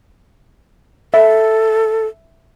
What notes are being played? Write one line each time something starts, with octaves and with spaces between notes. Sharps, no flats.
A4 E5